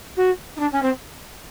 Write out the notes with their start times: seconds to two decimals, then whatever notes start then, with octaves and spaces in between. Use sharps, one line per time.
0.16 F#4
0.56 D#4
0.59 D4
0.72 C#4
0.82 C4